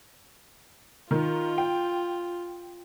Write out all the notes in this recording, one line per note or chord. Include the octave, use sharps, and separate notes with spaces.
D#3 F4
G5